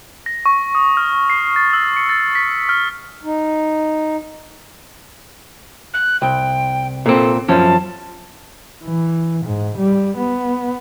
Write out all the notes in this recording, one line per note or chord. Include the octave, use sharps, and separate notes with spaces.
A#6
C#6
D#6
F6
C7
A6
E6
C#7
A6
B6
F6
D#4
F#6
C2 G5
A#2 C4 A4
F#2 F3 C#4 A5
E3
G#2
G3
B3